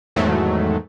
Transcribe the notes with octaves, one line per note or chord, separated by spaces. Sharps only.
E2 G#2 D#3 F#3 A3